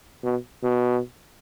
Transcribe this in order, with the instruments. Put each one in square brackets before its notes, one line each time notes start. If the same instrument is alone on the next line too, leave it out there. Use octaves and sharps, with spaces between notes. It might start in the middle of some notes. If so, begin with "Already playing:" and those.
[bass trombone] B2
B2